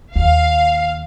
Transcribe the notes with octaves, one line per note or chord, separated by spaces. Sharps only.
D#2 F5